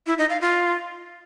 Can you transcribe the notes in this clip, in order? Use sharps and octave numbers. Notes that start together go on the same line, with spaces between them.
E4
D#4
F5
F4